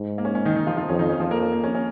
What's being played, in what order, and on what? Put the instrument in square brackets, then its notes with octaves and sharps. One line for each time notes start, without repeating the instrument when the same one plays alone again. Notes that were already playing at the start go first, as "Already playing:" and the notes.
Already playing: [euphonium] G#2
[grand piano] A#3
C#4
C#4
D#3 D#4
D#3 D#4
F3 F4
F3 F4
[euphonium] F2 [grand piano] C#4
[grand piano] D#3 D#4
C#4
[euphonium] F2 [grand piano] F3 F4
[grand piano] A#3 A#4
C#4
A#3
C#4
C#4